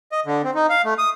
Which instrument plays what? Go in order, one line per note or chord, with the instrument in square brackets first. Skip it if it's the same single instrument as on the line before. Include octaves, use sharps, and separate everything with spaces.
[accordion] D#5
D3
C4
D#4
F5
A3
D#6